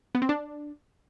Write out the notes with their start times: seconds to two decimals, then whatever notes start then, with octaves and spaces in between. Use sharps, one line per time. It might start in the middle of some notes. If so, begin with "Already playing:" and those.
0.15 B3
0.22 C4
0.29 D4